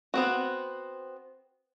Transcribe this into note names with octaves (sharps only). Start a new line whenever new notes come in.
B3 C4 F#4